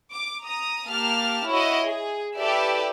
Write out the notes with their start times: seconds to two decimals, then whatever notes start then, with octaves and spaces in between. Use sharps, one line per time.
0.12 D6
0.43 A#5 D#6
0.88 A#3 G4 A5 F6
1.49 E4 F#4 C#5 D#5
1.85 G#4
2.37 E4 G4 A4 B4 D5 E5